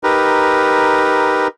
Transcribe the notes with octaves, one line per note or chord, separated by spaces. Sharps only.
D#4 G4 A#4 B4